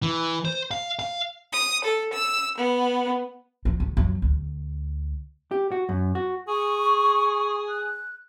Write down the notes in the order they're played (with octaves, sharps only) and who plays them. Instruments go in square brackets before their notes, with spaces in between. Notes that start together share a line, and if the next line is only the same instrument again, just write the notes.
[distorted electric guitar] E3
C5
F5
F5
[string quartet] D#6
A4
E6
B3
[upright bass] F3
G#2
F#2 F3
D2
[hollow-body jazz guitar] G4
F#4
F#2
F#4
[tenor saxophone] G#4 [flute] C#6
[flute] F#6